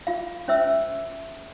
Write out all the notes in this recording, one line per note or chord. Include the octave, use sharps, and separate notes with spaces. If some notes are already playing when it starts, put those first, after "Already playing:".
F4 F5
C#4 C5 E5 E6